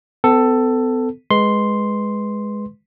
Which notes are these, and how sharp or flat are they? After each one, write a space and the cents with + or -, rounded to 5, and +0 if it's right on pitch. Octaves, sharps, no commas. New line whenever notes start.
B3 +45 A4 +10
G#3 +0 B4 +0 C6 +0